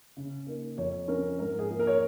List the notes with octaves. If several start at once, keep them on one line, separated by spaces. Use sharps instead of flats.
C#3
A#3 D#4
F2 C#5
F3 C#4 A#4
G#2 A#4
G#4
F3 A#3
A#4
C#5